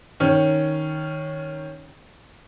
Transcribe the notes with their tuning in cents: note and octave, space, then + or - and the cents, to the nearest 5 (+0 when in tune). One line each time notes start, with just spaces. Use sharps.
D#3 +0 C#4 +0